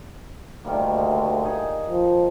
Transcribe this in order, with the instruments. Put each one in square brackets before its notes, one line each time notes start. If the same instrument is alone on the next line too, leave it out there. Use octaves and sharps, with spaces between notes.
[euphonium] D2 [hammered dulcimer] D#3 G3 A#3
[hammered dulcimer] D#4 G#4 G#5
[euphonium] F3